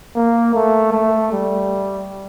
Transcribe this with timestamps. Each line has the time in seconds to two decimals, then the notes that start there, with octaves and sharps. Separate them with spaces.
0.16 A#3
0.54 A3
0.92 A3
1.32 G3